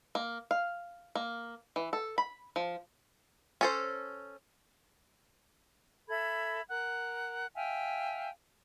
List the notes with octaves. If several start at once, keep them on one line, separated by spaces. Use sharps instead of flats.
A#3
F5
A#3
E3
A4
B5
F3
C#4 A4 C5
A4 E5 B5 G#6
A#4 F#5
E5 F5 G5 G#5